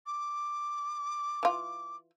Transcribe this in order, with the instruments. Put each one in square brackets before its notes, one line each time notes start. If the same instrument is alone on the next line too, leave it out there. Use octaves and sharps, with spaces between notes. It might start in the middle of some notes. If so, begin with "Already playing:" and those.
[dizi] D6
[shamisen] E3 F4